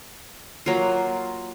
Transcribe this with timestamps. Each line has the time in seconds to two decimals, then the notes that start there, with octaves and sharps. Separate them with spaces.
0.66 F#3 A#3 F4